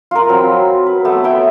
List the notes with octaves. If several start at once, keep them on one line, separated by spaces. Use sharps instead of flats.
F4 A#4
F#3 C4 B5
B4
A3 B3
B4 C#5 E5 G5